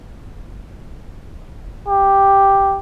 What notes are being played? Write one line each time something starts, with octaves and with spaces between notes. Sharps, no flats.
G4